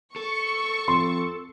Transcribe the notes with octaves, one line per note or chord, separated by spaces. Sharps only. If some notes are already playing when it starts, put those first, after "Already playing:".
A4 C#6
F2 C6